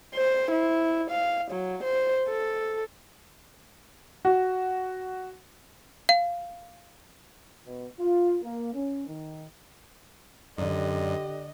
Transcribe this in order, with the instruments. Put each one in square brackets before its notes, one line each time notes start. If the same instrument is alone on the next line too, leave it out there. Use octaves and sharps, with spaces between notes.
[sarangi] C5
E4
F5
F#3
C5
A4
[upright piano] F#4
[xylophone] F5
[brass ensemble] B2
F4
A#3
C#4
D#3
[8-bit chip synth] F#2 [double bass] D3 [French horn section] G4 D5 [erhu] D#5